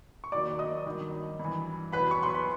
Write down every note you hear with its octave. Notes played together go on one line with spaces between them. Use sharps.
C#6
D#2 D#3 F#3 D5 D6
D#5 D#6
G2 D#3 F#3
G2 E3
E2 B2 F#3 B4 B5
C#6
C6
B5